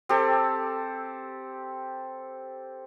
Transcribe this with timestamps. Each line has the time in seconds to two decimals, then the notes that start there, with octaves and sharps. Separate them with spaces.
0.09 C4 G4 A4